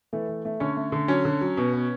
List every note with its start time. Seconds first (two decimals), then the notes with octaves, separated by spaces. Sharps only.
0.13 E3 A3 A4
0.29 E3
0.45 A3
0.60 D3 C#4 C#5
0.76 A3
0.92 D3
1.08 F#3 C#4 C#5
1.25 D3
1.41 F#3
1.57 B2
1.73 B3